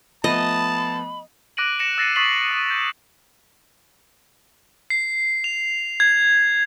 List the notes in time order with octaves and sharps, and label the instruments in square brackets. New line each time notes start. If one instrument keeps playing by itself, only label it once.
[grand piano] F3 A3 B3 [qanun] D#5 [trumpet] A5 [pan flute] B5
[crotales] D6 F#6 A#6 D7 D#7 F#7
A#6 C#7 E7
E6 A6 A#6 C7 C#7 D#7
C#6 D#6 A6 B6 C7 F#7
D#6
G6
C7
F7
G#6